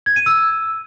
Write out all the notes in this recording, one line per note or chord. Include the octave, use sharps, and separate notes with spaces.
G#6
D#7
E6